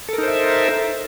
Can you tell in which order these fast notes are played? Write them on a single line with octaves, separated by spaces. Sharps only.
A4 A#4 D#4 C5 E5